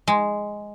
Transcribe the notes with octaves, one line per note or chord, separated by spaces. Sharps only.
G#3